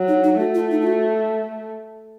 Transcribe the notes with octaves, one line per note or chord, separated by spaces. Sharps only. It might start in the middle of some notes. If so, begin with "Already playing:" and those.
Already playing: F#3
D#4
D#4
A3 F#4
F4
D#4
F4
F#4